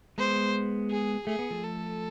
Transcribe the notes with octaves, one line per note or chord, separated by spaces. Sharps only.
G#3 B3 C5
G#4
A3 G#4
B3
F3 A3
A4